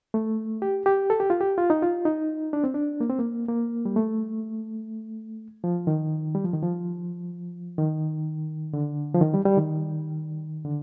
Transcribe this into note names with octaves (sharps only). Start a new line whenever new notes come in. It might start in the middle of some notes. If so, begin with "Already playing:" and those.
A3
G4
G4
A4
G4
F4
G4
F4
D#4
F4
D#4
D4
C4
D4
A#3
C4
A#3
A#3
G3
A3
F3
D#3
G3
F3
D#3
F3
D#3
D3
F3
D#3
G3
G3
D#3
D3